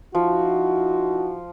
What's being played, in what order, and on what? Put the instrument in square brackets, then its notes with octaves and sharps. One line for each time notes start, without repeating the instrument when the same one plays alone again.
[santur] F3 [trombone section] D#4 E4 F#4